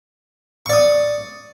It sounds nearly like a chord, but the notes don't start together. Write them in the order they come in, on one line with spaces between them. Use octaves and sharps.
C#6 D5 D#6